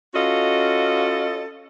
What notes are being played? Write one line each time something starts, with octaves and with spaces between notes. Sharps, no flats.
C#4 F4 F#4 A4 D#5 F5